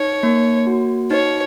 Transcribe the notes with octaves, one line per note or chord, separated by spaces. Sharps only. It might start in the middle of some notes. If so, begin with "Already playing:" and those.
Already playing: D#4 C#5
A#3
F#4
D#4 C#5